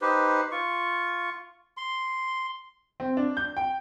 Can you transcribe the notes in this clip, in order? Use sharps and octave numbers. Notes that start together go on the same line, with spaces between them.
D#4 G4 B4 C5
F4 C#6
C6
C4
D4
G6
G5